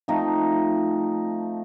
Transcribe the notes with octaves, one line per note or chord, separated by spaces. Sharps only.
F3 A3 C4 D#4